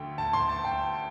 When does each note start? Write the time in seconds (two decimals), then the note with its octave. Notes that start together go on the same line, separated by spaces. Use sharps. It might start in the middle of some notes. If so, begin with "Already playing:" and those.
Already playing: D2 D3 A3 G5
0.18 A5
0.33 C6
0.49 A5
0.65 G5